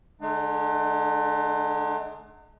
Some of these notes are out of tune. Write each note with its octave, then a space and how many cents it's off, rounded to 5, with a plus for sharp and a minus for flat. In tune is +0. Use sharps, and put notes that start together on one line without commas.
D3 +0 G#3 +40 D#4 -45